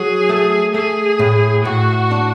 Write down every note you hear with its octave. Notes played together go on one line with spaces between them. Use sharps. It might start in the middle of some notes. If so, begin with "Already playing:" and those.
Already playing: F#3 G#4
A3
A3 G#4
A2
A2 F#4
D4